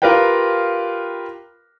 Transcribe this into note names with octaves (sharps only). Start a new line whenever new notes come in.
F4 G4 A#4 B4 F5 G5